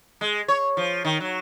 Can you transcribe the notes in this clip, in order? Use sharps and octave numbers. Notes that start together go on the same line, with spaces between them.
G#3
C#5
F3
D#3
F#3